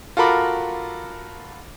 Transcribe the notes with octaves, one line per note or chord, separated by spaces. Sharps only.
F4 F#4 A4 A#4 B5 D6